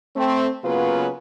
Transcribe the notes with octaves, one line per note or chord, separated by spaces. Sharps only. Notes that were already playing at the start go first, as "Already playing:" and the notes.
A3 C4
C#3 F#3 A#3 B3 F4 B4